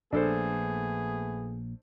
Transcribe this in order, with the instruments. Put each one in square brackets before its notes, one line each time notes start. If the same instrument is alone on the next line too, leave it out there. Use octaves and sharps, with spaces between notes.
[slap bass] A#1 [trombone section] A3 B3 G#4 [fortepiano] D4 A4 C5